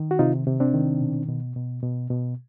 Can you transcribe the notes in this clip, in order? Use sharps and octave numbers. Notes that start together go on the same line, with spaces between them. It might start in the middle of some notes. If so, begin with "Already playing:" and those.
Already playing: D#3
F#4
C3 D#4 F4
C3
C4 D4
D#3
B2
B2
B2
B2
B2